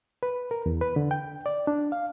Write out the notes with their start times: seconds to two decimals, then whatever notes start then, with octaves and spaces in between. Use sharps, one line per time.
0.23 B4
0.51 A#4
0.66 E2
0.81 B4
0.96 D3
1.11 G5
1.46 D5
1.67 D4
1.92 F5